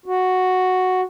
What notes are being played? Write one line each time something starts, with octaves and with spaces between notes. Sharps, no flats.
F#4